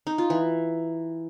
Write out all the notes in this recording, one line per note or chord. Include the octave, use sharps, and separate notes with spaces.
D#4
F4
E3